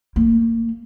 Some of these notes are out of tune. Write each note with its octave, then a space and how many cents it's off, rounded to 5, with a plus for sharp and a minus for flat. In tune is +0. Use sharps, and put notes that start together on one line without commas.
A#3 -30